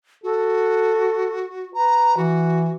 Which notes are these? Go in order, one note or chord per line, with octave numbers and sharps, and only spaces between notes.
F#4 A4
B4 A#5
E3 F#4